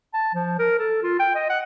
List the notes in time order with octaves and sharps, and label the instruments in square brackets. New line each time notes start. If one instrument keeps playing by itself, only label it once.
[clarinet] A5
F3
A#4
A4
F4
G5
D#5
F#5